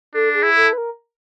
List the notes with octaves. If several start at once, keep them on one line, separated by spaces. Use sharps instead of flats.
D4 A4
G#4
E4
A4
B4
A#4